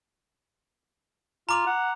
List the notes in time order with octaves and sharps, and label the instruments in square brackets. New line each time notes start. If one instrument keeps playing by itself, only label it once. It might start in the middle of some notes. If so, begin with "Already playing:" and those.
[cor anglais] F4 [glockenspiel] A#5 D6 F7
[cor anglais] F#5